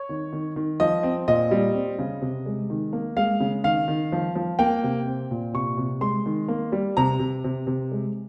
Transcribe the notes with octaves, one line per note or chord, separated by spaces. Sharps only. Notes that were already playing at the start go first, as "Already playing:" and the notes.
Already playing: C#5
D#3
D#3
D#3
F3 D#5
C4
A#2 D#5
G3
C4
C#3
C3
G#3
D#3
A#3
G#3 F5
C#3
D#3 F5
D#3
F3
F3
A#3 G5
C3
C4
A#2
C3 C#6
C3
G#3 C6
D#3
A#3
G3
C3 A#5
C3
C3
C3
G#3